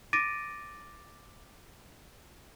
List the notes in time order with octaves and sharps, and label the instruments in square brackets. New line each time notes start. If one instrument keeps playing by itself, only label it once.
[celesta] D6 A6 A#6 D7 D#7